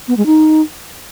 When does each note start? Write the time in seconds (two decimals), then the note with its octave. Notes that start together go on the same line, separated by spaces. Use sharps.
0.08 B3
0.17 G#3
0.26 D#4